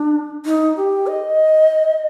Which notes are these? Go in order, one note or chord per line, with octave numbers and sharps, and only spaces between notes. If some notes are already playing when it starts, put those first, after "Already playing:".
Already playing: D4
D#4
G4
D#5